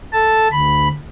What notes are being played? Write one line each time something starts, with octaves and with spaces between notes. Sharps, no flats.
A4 A5
D2 B5